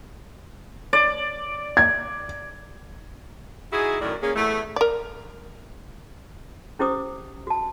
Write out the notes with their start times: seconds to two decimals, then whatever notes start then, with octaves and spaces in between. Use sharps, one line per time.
0.93 D5
1.77 G#6
3.73 D#4 E4 F#4 G#4
4.01 F#2 A2 D#3 F#3 A#4 D5
4.23 A#3 C#4 G#4
4.36 E2 A3
4.76 A#4 D5
6.79 C#4 E4 G4 C5 D6 D#6
7.47 F#4 A5